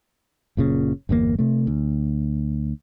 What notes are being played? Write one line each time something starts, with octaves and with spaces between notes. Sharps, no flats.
F#1 A#2 C#3
G1 E2 B2 A#3
C3 A3
D2